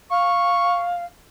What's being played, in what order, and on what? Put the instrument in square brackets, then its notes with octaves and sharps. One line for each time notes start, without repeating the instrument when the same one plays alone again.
[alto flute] F5 [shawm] C#6